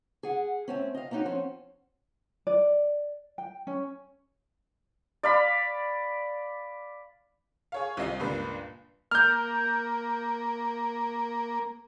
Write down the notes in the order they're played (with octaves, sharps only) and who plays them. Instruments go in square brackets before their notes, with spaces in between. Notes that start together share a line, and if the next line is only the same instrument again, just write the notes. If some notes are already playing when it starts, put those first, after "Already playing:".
[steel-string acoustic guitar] G#4 F#5
A3 C4 C#4
D#5 F5
A#3 B3 C#4 D#4 F#4
F3 C4 C#4
[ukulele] D5
G5
C#4
[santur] D5 F5 B5
[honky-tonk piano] G#4 C#5 F5
C2 C4 F4 D#5 C7
C#2 G2 A#2 D4 B4
[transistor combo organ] A#3 [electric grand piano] F6 G6